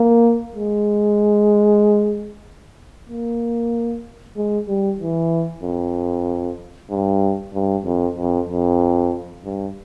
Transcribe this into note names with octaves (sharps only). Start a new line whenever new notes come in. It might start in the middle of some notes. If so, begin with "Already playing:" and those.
Already playing: A#3
G#3
A#3
G#3
G3
E3
F2
G2
G2
F2
F2
F2
G2